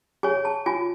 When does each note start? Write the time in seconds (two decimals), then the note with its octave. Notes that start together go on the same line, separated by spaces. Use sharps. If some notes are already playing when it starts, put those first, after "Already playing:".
0.23 G#4 C#5 G#5
0.45 A5
0.66 F4 G#5